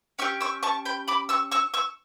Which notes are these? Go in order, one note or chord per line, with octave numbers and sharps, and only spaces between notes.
C#4 G4 C#6 E6
C#6 E6
A5 C#6
G5 B5
B5 D6
C#6 E6
C#6 E6
C#6 E6